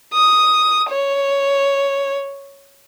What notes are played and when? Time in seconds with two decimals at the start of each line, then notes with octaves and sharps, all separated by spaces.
0.13 D#6
0.90 C#5